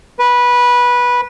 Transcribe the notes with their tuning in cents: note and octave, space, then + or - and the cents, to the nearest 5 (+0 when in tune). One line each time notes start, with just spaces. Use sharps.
B4 -15